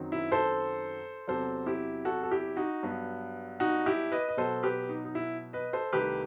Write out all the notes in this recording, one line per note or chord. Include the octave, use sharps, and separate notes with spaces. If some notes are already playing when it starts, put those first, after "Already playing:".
Already playing: F#2 D#3 F#3 C4
E4
A4 C5
E2 C3 F#3 A4 C5
E4 G4
F#4 A4
A4
E4 G4
D#4 F#4
G2 F#3 B3
D#4 F#4
E4 G4
B4 D#5
D#5
B2 F#3 B3 A4 C5
G4 B4
D#4
D#4
E4
B4 D#5
A4 C5
C2 C3 D#3 A3 G4 B4